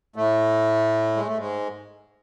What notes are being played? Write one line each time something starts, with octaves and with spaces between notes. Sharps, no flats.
A2 A3
G#3
A3
G#2 G#3